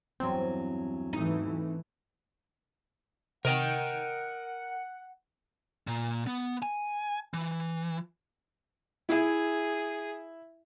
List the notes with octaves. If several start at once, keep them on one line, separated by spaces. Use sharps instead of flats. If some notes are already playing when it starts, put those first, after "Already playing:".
E2 G2 F#3 C4
G#2 E3 A3 D#4
C3 A#4 D#5 F#5 G5 D7
A#2
B3
G#5
E3
E4 G#4 E5